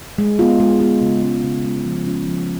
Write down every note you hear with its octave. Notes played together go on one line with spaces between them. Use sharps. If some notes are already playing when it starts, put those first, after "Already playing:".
G#3
B3 F4
G#3
B3 F4
C#3
G#3 C#4
C#3
G#3 C#4
F3
G#3 C#4 F4
F3